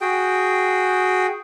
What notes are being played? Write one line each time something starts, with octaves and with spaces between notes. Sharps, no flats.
F#4 G#4 G5